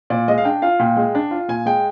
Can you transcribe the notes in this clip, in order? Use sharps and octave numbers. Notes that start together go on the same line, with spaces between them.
A#2 D5
G#3 D#5
F5
D4 G5
F4 F5
A#2 G5
G#3
D4
F4
A#2 G#5
G#3 G5